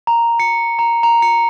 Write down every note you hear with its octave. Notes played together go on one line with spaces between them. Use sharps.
A#5
C#7
A#5
A#5
C#7